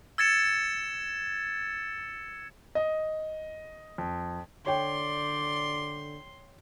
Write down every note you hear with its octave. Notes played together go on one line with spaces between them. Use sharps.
E6 G#6 A6 C#7 E7
D#5
F2
D3 C#5 D5 G5 C6